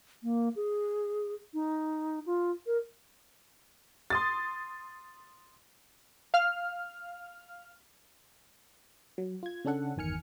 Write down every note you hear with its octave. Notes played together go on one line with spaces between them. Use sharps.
A#3
G#4
D#4
F4
A#4
C6 D#6 A6
F5 F6
F#3
F4 G#6
C#3 C#4 D4 A4 F#5
G1 E2 D#3 G#5 F6 C#7